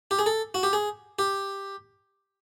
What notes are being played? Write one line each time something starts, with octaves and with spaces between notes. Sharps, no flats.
G4
G#4
A4
F#4
G4
G#4
G4